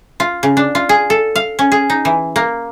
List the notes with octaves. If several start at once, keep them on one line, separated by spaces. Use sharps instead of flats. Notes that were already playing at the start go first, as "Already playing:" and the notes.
F4
C#3
D4
F4
G#4
A4
F5
C#4
G#4
D#4
E3
A#3